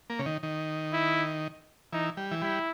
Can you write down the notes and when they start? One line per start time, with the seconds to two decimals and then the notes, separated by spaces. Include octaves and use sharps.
0.10 A#3
0.19 C#3
0.26 D#3
0.43 D#3
0.93 E4
1.92 E3 D#4
2.17 G3
2.31 E3
2.41 G3 E4